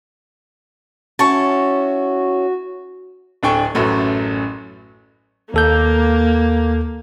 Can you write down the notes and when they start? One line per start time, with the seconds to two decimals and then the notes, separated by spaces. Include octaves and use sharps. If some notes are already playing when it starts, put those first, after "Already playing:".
1.19 C#4 E4 F#4 A5 C#6
3.43 D1 D4 A4 G5 G#5 C#6
3.75 A1 F#2 F#3 A3
5.54 D#2 A#3 A4 G6